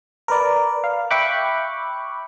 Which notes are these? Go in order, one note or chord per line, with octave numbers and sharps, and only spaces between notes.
A#4 B4 D5
F5
E5 G5 B5 C#6 D6 F#6